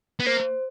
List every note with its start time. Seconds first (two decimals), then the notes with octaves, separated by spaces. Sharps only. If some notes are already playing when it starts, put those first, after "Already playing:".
0.20 B3
0.26 A#3 C5